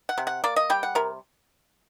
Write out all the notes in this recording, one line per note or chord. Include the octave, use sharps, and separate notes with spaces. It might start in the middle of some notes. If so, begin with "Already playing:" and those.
F#5
C3
F#5
A#3 D5
D#5
G3 G5
F#5
C3 A#4